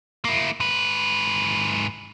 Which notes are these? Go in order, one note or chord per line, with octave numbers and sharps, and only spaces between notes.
A#3 E4
G#2 B4